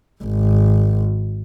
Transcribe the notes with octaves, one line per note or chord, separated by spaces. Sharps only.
G#1